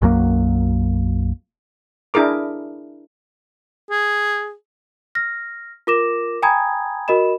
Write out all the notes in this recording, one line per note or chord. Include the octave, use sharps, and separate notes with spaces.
B1 F#2 F#3 A#3
D4 E4 G#4 A#4 D6
G#4
F6 A#6
F4 A#4 D6 A#6 E7
G5 G#5 A#5 B5 D#6 G#6
F#4 A#4 D#5 B5 E7